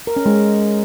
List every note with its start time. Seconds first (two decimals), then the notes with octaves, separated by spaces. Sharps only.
0.07 A#4
0.16 C#4
0.26 G#3